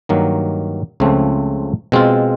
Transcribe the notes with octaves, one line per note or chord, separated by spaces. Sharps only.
G2 D#3 F#3 A#3
C#2 C#3 F3 A3 C4
B2 G#3 C4 F4